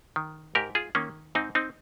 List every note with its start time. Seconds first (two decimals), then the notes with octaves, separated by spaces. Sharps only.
0.16 D#3
0.55 G#2 G4 A#4
0.75 F4 G#4
0.95 D#3 A#3 C#4
1.35 G#2 C4 D#4
1.55 C4 D#4